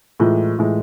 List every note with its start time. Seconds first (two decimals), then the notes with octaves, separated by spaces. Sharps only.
0.20 A2 E3 G#3 F4
0.59 A2 E3 G#3